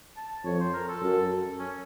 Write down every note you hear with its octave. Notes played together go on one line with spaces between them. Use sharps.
A5
F2 C#5
C5
A#4
A4
F#2
C#4